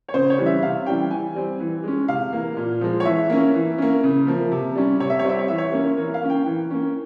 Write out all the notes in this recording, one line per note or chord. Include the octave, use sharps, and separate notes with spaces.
C#5
C#3 C5
C#5
E3 G3 C#4
E5
C3 F5
E3 G3 C#4 G5
E3 G#5
G3 C4
E3
G#3 C#4
C3 F5
E3 A#3
A#2
F3 G#3
C#5
E3 E5
A#3 C#4
E3
A#3 C#4
C#3
F3 A#3
C3
G3 C#4
C3 C#5
E5
C#5
G3 C4 E5
C#5
E3 E5
C#5
A#3 C#4
E3 A#4
F5
A#3 C#4
G5
E3
A#3 C#4